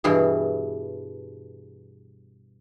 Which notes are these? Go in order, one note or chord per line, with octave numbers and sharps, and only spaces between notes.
G2 B2 E3 G#4